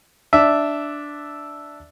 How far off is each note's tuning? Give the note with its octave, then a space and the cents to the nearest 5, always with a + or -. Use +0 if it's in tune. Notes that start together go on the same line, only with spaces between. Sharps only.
D4 +0 E5 +0